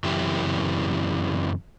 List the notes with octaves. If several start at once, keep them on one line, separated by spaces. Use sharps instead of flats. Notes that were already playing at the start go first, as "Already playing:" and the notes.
F#2 C#3 E3 C4 E4 G4